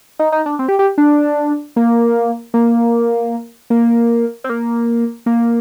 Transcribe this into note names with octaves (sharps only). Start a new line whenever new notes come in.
D#4
D#4
D4
C4
G4
G4
D4
A#3
A#3
A#3
C4
A#3
A#3